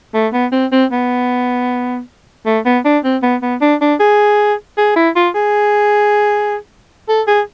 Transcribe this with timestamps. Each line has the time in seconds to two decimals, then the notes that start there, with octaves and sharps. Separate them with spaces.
0.14 A3
0.33 B3
0.52 C4
0.72 C4
0.92 B3
2.46 A3
2.65 B3
2.85 D4
3.04 C4
3.22 B3
3.42 B3
3.61 D4
3.81 D4
4.00 G#4
4.78 G#4
4.96 E4
5.16 F4
5.35 G#4
7.09 A4
7.27 G#4